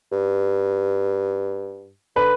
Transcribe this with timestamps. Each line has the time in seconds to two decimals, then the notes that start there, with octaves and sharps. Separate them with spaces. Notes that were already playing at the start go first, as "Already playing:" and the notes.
0.12 G2
2.16 D3 B4